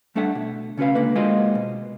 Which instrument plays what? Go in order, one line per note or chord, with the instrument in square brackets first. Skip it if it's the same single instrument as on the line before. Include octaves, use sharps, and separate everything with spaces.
[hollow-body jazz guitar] G3 A3 D4 A4 E5 F#5
B2
C#3 C#4 F#4 B4 F5
C#2 D3 A#3 B4
G#3 A#3 C4 F4 F#4 D#5
B2